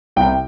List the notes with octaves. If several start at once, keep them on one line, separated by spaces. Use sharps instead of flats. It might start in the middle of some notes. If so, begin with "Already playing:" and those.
C2 G5